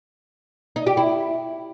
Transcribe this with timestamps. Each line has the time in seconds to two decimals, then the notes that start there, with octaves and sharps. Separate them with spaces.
0.76 D#4
0.87 G4
0.97 E4